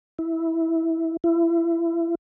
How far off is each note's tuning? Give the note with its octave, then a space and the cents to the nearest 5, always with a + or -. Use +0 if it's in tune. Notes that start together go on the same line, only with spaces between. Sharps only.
E4 -10
E4 +30